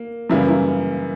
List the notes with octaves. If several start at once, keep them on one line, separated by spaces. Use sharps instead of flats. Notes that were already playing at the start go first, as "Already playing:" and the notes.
Already playing: A#3
F#2 C#3 E3 G3 A#3 E4
E4